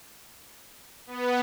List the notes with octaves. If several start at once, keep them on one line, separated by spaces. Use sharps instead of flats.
B3